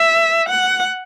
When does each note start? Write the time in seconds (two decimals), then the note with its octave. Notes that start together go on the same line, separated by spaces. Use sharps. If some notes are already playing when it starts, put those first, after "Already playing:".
Already playing: E5
0.49 F#5